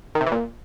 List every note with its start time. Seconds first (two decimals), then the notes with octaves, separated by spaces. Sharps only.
0.15 D#3
0.21 C3
0.26 E3
0.32 A#2